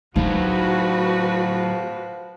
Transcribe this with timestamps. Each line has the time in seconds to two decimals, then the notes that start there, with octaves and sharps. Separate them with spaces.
0.16 A2 F3 F#3 D#4 F#4 B4